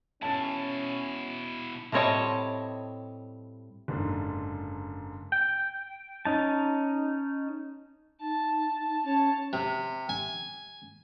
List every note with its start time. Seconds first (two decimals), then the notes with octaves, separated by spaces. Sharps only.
0.22 B2 C#4 E4 A5 A6
1.92 A2 G3 C4 C#5 D#5 A5
3.88 F#1 G#2 D3
5.32 G5
6.25 C#4 D#4 A5
8.21 D#4 A5
9.05 C#4 C#5 A5
9.53 C3
10.09 G#5